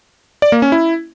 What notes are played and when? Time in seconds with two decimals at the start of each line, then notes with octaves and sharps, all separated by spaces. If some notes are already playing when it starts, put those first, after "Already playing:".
0.42 D5
0.52 A#3
0.62 C#4
0.72 E4